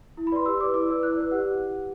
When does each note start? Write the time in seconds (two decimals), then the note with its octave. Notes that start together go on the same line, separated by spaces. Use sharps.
0.17 E4
0.27 B5
0.32 B4 D5 C6
0.46 G4 E6
0.60 B4 D6
0.63 D5
0.74 E4 D6
0.88 B4 D5 E6
1.03 E4 F#6
1.17 B4 D5
1.31 G4 F#5